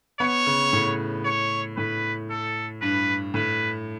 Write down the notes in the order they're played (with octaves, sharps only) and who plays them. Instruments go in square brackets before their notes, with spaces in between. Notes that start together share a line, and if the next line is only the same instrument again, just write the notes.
[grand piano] B3 [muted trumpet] C#5
[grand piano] C#3
A2
[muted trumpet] C#5
[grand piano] A2 [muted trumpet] B4
[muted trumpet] A4
[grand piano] G2 [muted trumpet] B4
[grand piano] A2 [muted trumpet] B4